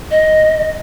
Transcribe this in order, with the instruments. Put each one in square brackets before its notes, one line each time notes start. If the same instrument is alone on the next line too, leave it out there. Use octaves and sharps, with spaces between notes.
[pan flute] D#5